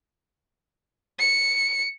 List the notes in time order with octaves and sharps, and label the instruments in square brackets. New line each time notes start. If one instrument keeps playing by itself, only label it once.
[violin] C#7